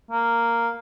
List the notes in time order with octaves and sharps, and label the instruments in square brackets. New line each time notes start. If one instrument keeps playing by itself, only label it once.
[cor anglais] A#3